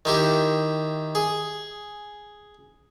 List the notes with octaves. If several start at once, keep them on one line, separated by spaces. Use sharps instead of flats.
D#3 E4 G4
G#4